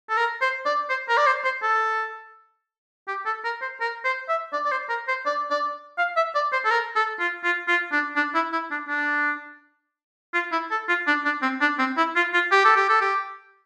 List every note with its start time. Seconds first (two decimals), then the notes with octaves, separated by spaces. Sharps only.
0.09 A4
0.17 A#4
0.41 C5
0.66 D5
0.90 C5
1.09 A#4
1.17 D5
1.26 C5
1.44 C5
1.63 A4
3.08 G4
3.26 A4
3.44 A#4
3.62 C5
3.81 A#4
4.05 C5
4.29 E5
4.53 D5
4.65 D5
4.71 C5
4.89 A#4
5.08 C5
5.26 D5
5.50 D5
5.98 F5
6.16 E5
6.35 D5
6.52 C5
6.65 A4
6.71 A#4
6.96 A4
7.19 F4
7.44 F4
7.68 F4
7.92 D4
8.16 D4
8.35 E4
8.53 E4
8.71 D4
8.88 D4
10.34 F4
10.52 E4
10.71 A4
10.88 F4
11.07 D4
11.25 D4
11.42 C4
11.61 D4
11.79 C4
11.97 E4
12.16 F4
12.34 F4
12.52 G4
12.65 A4
12.76 G4
12.89 A4
13.01 G4